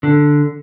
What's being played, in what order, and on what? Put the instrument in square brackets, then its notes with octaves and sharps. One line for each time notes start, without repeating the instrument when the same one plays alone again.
[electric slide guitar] D3